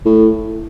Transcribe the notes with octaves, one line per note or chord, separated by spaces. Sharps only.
A2